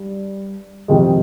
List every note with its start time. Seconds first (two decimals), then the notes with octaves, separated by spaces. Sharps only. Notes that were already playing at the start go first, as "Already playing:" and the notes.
Already playing: G2
0.88 F2 C3 D#3 G#3